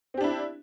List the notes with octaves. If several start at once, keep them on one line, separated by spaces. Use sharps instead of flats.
C4 D4 E4 G4